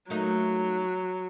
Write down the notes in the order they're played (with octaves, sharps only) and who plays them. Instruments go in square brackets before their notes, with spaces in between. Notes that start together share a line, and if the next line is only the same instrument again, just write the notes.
[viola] F#3 [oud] A3 A#3 D#4